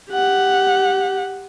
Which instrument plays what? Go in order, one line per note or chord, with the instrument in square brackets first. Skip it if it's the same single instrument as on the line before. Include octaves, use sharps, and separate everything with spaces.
[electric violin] G4 F#5